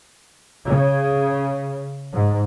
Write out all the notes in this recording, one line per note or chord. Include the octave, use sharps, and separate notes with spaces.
C#3
G#2